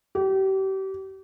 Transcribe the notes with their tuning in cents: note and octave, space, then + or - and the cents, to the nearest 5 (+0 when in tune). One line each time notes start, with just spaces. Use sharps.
G4 -35